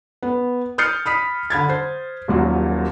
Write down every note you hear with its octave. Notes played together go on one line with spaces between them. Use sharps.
B3
D#6 F6 G6 A6 C7 C#7
B5 D#6 B6
D3 B5 G#6 A6
C5
D#1 D#2 A#2 F#3